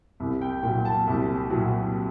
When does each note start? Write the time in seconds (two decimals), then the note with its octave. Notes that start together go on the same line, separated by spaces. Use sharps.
0.20 C2
0.42 G5
0.63 A#2 F#3 G5
0.85 A5
1.07 C2
1.50 A#2 F#3